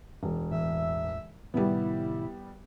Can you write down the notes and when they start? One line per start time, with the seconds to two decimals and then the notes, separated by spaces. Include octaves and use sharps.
0.23 E1
0.51 A1 E2 E3 E5
1.54 A2 C3 D#3 G3 B3 E4